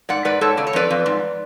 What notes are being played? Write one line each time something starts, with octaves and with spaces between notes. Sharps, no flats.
G#2 D5 F#5
G#2 B4 D5
G#2 A4 C#5
C#3 D5
C#5
F2 B4 D5
F2
G#2